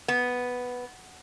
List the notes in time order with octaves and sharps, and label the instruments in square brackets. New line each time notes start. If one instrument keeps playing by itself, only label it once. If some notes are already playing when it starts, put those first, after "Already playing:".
[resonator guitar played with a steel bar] B3